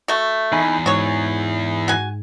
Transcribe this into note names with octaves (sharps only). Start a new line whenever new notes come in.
A3 F#4
E2 D#4 G#5 B5
G#2 F#4 C#5
F#4 G#5